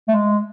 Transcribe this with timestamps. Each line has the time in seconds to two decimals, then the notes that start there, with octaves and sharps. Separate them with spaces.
0.08 A3
0.12 G#3